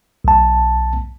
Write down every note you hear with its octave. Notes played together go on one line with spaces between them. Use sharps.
B1 A5